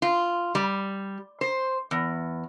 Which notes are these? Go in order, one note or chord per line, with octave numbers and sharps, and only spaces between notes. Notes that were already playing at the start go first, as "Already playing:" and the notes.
F4
G3
C5
E2